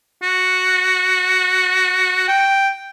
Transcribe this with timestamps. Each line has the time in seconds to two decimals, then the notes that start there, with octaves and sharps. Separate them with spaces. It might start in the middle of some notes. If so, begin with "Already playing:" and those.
0.23 F#4
2.28 G5